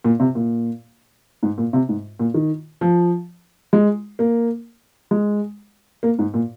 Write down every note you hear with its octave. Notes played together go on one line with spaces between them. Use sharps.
A#2
C3
A#2
G#2
A#2
C3
G#2
A#2
D#3
F3
G#3
A#3
G#3
A#3
G#2
A#2